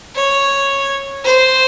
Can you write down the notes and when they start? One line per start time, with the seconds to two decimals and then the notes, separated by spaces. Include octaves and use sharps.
0.15 C#5
1.24 C5